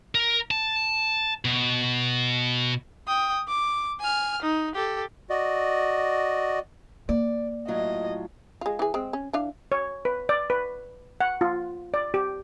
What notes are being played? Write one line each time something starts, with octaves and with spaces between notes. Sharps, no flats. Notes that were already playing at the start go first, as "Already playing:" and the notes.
A#4
A5
B2
G5 D#6
D6
G#5 F6
D#4
G4 A4
F#4 D5 D#5
A#3 D5
A2 F#3 F4 D#5
G#3 F4
E3 G#4
G#3 C4
C#4
E3 D4 F5
C#5
B4
D5
B4
F#5
F4
D5
G4